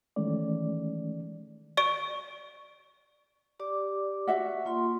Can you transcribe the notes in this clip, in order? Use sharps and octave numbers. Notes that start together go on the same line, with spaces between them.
D#3 E3 G#3 A3 C#4 D5
D5 C#6 D7
G4 D5 D6
F#4 E5 F#5
A#3 F4 C6